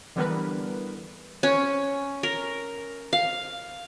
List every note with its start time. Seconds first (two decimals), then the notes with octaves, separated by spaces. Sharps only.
0.16 D3 E3 G3 B3 A#4 B4
1.43 C#4
2.23 A#4
3.13 F5